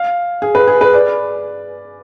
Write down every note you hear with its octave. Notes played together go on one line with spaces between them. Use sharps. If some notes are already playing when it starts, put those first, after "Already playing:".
Already playing: F5
G#4
B4
G#4
B4
D5